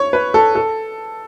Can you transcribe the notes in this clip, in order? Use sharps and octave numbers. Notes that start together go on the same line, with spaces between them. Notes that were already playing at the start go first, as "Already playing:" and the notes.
Already playing: C#5
B4
A4
A4